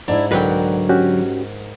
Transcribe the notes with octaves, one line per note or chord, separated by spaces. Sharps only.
G#2 D4 E4
C2 D3 F#3 A#4 B4 D5 F#5 G5
C#4 F#4 G4